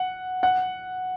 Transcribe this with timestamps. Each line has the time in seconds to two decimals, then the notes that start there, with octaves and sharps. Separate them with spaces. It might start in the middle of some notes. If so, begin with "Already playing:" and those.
Already playing: F#5
0.43 F#5